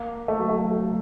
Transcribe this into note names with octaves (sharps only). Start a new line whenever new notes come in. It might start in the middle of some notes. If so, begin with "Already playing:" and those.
Already playing: A#3
A3
F#3
A3
F#3